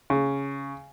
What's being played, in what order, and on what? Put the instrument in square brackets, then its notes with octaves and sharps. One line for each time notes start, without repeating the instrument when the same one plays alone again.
[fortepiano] C#3